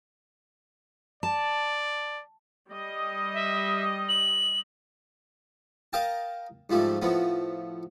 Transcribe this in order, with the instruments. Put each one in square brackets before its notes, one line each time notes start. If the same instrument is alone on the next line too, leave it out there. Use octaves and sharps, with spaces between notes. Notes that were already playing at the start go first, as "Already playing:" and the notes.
[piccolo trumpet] D5 [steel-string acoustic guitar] A5
[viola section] G3 D#5
[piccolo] E5
F#7
[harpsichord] A#4 D#5 F5 G5 A5
G#2 F3 G3 A3
A2 F3 B3